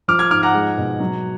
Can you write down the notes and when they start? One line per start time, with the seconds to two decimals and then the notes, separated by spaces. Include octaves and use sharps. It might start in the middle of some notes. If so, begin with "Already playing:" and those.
0.08 F3 D6 F6
0.19 F6 G#6
0.31 G#2 D6 F6
0.43 F#5 A#5
0.54 G#3
0.78 B2
1.00 F#3